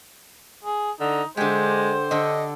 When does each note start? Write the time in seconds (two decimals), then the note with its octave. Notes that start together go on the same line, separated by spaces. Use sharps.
0.64 G#4
1.01 D3 D#4
1.37 D3 G#3 G4 C5
2.11 D3 A4 D#5